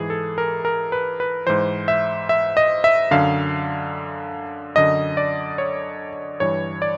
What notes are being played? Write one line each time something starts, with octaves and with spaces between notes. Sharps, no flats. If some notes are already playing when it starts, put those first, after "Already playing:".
Already playing: G#2 E3 G#4
A4
A#4
A#4
B4
B4
G#2 E3 C5
E5
E5
D#5
E5
F#2 D3 F5
F#2 D3 D#5
D5
C#5
G2 E3 C#5
D5